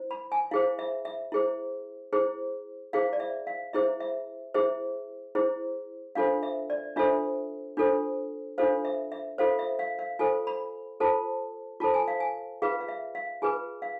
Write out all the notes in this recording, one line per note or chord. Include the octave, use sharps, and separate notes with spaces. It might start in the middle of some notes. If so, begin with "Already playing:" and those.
Already playing: E4 C5
B5
G#5
E4 G#4 C5 F5
E5
E5
E4 G#4 C5
E4 G#4 C5
E4 G#4 C5 F5
D5
E5
F5
E4 G#4 C5 E5
E5
E4 G#4 C5 E5
E4 G#4 C5
D4 F4 A4 C5 F5
E5
D5
D4 F4 A4 C5 E5
D4 F4 A4 C5
D4 F4 A4 C5 F5
E5
E5
F4 A4 C5 F5
E5
F5
F5
F4 A4 C5 G#5
B5
F4 A4 C5 A5
F4 A4 C5 A5
G#5
F5
G#5
F4 G#4 B4 F5
F5
E5
F5
F4 G#4 B4 G#5
F5